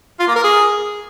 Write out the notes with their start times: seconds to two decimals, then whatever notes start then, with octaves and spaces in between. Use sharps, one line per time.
0.19 F4
0.28 A#3
0.36 A#4
0.44 G#4